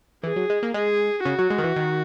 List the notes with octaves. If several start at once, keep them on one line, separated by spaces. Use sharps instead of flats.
E3 G#4
F#3
G#3
A#3
G#3 G#4
C#3 F#4
F#3
G#3
D#3
E3
D#3